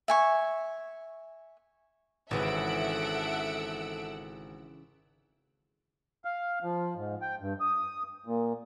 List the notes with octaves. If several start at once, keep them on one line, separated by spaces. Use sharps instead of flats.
E5 G#5 C#6
G#1 C#3 E3 A4 E5 F#5 E6 D7
F5
F3
G#2
G5
G2
D#6
A#2